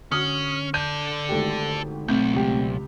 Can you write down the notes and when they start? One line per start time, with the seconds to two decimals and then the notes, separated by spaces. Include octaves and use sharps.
0.12 D3 C#4 F#4 D#6 F6
0.74 A4 D5 G6 D#7
1.29 G#1 A3 G4
2.08 B1 A3 C4 G6
2.33 C#2 G4